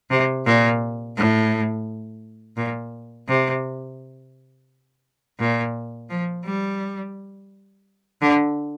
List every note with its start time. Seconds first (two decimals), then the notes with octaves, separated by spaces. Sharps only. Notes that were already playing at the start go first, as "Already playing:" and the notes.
0.10 C3
0.46 A#2
1.17 A2
2.57 A#2
3.28 C3
5.40 A#2
6.10 F3
6.45 G3
8.22 D3